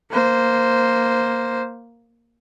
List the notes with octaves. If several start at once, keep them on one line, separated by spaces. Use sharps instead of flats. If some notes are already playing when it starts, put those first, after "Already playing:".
A#3 C5